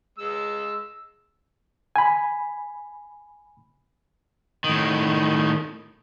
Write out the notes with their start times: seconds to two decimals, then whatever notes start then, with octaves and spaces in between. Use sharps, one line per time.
0.18 G#3 E6
1.96 G#5 B5
4.64 A2 D#3